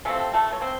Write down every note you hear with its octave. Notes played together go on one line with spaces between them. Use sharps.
C3 F3 A3 C4 A4
A3 A4
C#5
C4 C5